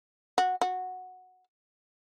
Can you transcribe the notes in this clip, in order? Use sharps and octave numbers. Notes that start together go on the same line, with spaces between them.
F#4
F#4